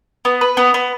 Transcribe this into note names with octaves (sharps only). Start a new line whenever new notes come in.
B3
B4
B3
B3